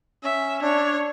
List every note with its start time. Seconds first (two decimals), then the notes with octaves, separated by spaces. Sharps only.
0.24 C#4 E5
0.62 D4 C#5